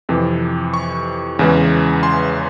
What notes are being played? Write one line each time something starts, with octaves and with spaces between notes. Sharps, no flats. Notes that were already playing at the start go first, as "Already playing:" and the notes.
F2 C3 E3
C#6
E2 C#3 E3 G#3
C6